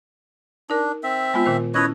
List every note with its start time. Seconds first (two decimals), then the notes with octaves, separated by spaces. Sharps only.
0.70 D4 D#4 A#4
1.03 C4 E5
1.34 G#3 B3 F4
1.46 A#2 D#3 C5
1.74 C#4 E4 B4 C#5 D#5 A5